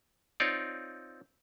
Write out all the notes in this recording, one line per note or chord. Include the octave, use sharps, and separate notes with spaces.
C4 D#4 F4 C#5 D5